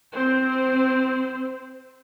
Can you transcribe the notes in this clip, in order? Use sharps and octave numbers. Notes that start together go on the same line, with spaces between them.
C4 C5